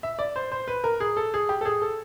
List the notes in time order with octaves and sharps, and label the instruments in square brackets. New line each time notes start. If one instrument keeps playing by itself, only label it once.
[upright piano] E5
D5
C5
C5
B4
A#4
G#4
A4
G#4
G4
A4
G#4
A4